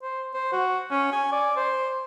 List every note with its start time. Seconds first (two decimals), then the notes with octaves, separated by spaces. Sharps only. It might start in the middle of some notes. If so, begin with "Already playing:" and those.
0.02 C5
0.34 C5
0.52 F#4
0.91 C#4
1.12 G#5
1.32 D5
1.56 C5